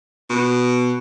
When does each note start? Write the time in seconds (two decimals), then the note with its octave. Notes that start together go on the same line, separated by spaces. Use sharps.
0.30 B2